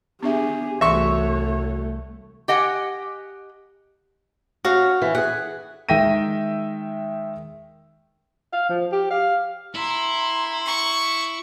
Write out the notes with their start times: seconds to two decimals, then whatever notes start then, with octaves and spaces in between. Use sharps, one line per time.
0.23 B3 D4 G4 G#4 E5
0.81 C2 E3 A3 F#4 C#5 E5 C6 C#6
2.48 G4 D#5 F#5 G#5
4.65 C#4 F#4 F5
5.02 E3 C#4
5.15 G4 G#4 F#5
5.89 D#3 G#3 E5 G5 A#6 D#7
8.53 F5
8.69 F3
8.92 G4
9.10 F5
9.75 E4 A#5 C6
10.66 C#6